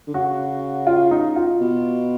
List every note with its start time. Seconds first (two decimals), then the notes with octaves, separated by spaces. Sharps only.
0.07 D3
0.14 C#3 F#4
0.87 F4
1.11 D#4
1.36 F4
1.60 B2